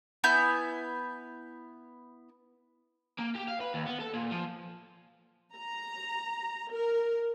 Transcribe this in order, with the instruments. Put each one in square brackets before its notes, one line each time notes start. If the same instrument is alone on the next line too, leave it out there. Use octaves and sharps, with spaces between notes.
[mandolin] B3 E4 G#5 G6
[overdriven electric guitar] A#3
G4
F5
B4
D#2
B3
A4
A#2
F3
[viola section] A#5
A#4